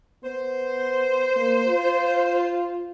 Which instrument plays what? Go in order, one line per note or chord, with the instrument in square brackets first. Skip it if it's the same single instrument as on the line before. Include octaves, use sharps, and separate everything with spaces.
[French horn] B3 [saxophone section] C5
[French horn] A#3
F4